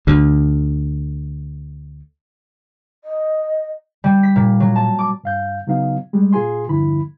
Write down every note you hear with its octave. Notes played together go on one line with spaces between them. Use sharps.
D2 D3
D#5
G3
B6
A#2
F#3
A5
D6
G2 F5 G6
C#3 F#3 B3 D#4 F5
G3 G#3
A#2 F4 G#4 G#5 C6
E2 G2 D3 F3 E4 B5